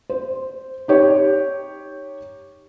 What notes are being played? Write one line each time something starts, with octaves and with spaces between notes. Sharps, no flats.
C5
D#4 G4 C#5